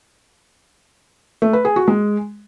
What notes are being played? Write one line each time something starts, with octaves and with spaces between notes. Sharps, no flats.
A3
B4
G#4
F#4
G#3